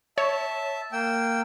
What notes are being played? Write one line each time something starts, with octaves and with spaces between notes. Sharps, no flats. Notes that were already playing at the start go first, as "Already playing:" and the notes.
C#5 E5 A5
A#3 G5 E6